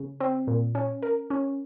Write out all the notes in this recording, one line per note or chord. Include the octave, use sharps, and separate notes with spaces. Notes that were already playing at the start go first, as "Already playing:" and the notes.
Already playing: C#3
C4
A#2
C#4
A#4
C#4